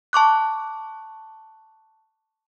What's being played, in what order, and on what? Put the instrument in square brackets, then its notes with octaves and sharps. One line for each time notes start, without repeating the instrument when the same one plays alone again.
[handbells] A5 C#6 D6 F#6